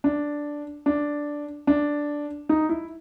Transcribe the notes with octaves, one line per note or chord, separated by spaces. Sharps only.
D4
D4
D4
D#4
E4